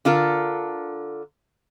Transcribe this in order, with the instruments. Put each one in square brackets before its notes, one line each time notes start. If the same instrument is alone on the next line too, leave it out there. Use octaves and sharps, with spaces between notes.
[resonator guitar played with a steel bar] D3 F4 A4 A#4